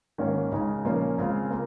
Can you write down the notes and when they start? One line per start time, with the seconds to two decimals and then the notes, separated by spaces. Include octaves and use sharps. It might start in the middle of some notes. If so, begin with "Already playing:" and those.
0.18 G#2 D#3 A#3 C#4 F4
0.52 C#3 G#3 D#4
0.85 A#2 F3 A#3 C#4 F4
1.18 C#3 G#3 C4 F4
1.51 A#3